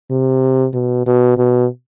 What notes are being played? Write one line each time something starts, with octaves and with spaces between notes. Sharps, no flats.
C3
B2
B2
B2